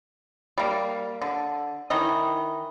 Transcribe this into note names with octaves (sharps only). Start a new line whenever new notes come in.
G3 A#3
D3
D#3 E3 D#5